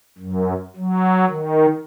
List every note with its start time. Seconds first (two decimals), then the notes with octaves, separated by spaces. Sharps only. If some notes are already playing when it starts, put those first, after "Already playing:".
0.18 F#2
0.76 F#3
1.29 D#3